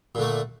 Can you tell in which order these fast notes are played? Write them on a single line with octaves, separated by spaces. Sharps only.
A#2 D3 A3